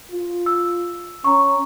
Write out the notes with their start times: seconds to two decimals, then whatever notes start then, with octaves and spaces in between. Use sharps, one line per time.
0.11 F4
0.46 E6
1.24 C#4 A#5 C#6